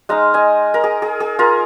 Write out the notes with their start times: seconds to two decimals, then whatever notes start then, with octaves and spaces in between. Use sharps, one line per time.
0.09 G#3 D#4 F5 A#5
0.34 D#5 G#5
0.74 A#4
0.84 G#4
1.02 G#4
1.20 G#4
1.39 F4 A#4